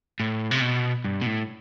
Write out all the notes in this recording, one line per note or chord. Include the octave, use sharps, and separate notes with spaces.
A2
C3
B2
G2
B2
A2